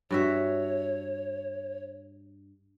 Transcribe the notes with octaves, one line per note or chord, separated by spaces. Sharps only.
G2 F#4 C#5 E5